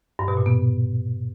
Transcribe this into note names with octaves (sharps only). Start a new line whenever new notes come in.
G2
B2
A#2
B3